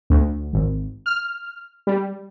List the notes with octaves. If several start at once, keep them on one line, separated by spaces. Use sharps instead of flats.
D2
G#1
F6
G3